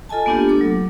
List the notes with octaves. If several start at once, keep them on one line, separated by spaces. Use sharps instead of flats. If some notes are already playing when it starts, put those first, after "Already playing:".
F4 A4 D#5 G#5 A5
A#3 B3 D4 F4 G4
A3 A4 D6
F#3